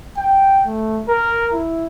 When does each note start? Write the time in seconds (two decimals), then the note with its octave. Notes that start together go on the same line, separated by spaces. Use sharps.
0.17 G5
0.66 A3
1.08 A#4
1.52 E4